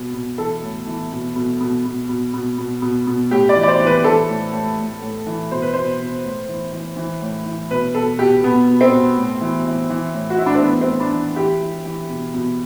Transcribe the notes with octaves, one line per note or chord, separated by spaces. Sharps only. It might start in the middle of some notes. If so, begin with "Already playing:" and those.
Already playing: B2
B2
E3 A4
A2
E3
B2
B2
B2
B2
B2
B2
B2
B2
B2
A2 G4
D5
E3
D5
C5
E3
B4
E3 A4
A2
A2
A2
A2
E3
B2 C5
B4
B2 C5
B2
A2
E3
E3
E3
A2
E3
B2 B4
B2 A4
B2 G4
B2 B3
B2
C4
B2
A2
E3
E3
E3
A2
F#4
A2 E4
D4
C4
E3 B3
C4
A2
D4
E3
E3 G4
E3
E3
B2
B2